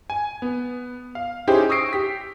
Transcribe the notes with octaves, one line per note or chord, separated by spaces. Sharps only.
G#5
B3
F5
C#4 D#4 E4 G4 G#4 C5
C#6 D#6 E6 A#6 C7 D7
G4 B6